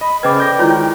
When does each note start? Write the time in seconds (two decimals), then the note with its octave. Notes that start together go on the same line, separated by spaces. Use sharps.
0.01 D#5 B5
0.23 C#3 B4 C5 D#5 G5 D6 G#6
0.38 A4 D5 G6 A#6
0.59 D#3 G#3 E4 F4 C#5 A#5